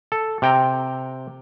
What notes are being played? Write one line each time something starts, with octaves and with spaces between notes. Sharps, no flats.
A4
C3 G5 A#5